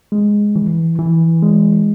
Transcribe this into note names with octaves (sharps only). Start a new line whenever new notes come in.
G#3
E3
E3
G#3